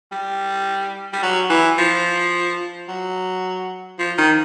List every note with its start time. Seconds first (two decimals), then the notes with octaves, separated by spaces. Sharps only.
0.12 G3
1.13 G3
1.23 F#3
1.50 E3
1.78 F3
2.88 F#3
3.99 F3
4.18 D#3